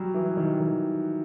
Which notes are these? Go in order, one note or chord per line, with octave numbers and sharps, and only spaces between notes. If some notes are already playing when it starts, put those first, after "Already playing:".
Already playing: F#3 G3
E3
D#3
D#3